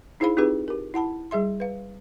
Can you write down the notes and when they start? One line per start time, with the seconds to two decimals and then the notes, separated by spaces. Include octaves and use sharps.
0.20 D#4 E4 G#4 C5 F5 B5
0.37 C4 D#4 F4 G4 G#4 B4
0.68 G4 A#4
0.94 E4 F#5 A5 B5
1.31 G3 G#4 E5 C6
1.60 B4 F5